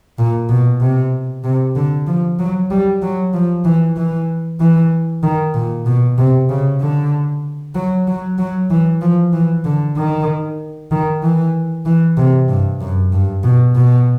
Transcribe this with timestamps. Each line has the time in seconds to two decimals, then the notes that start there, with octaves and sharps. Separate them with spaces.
0.18 A#2
0.50 B2
0.81 C3
1.44 C3
1.76 D3
2.07 F3
2.39 F#3
2.71 G3
3.02 F#3
3.34 F3
3.65 E3
3.97 E3
4.60 E3
5.23 D#3
5.55 A#2
5.86 B2
6.18 C3
6.49 C#3
6.81 D3
7.75 F#3
8.07 F#3
8.39 F#3
8.70 E3
9.02 F3
9.33 E3
9.65 D3
9.97 D#3
10.91 D#3
11.23 E3
11.86 E3
12.18 C3
12.49 G2
12.81 F#2
13.12 G2
13.44 B2
13.75 B2